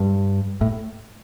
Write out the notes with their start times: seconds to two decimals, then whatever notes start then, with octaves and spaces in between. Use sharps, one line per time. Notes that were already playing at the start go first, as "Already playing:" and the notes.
Already playing: G2
0.61 A2